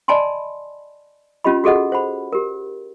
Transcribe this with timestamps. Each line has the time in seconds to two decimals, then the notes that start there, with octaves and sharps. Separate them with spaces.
0.08 D5 D#5 G#5 A5 B5 C6
1.45 C#4 F4 G4 D#5 B5
1.64 F#4 G#4 A4 D#5 F#5
1.92 C5 F#5 B5
2.33 G4 A#4